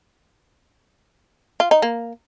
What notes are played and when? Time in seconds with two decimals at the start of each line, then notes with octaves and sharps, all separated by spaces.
1.60 F4
1.71 D#4
1.82 A#3